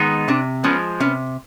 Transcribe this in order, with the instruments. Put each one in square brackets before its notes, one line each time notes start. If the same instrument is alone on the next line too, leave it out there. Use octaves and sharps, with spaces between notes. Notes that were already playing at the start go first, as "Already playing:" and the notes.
Already playing: [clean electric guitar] D#3 G#3 B3 D#4
[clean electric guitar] C3 [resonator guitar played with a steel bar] C4 D4
[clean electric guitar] F3 G#3 [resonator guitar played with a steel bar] B3 C#4
[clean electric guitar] C3 [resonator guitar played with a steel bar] B3 C#4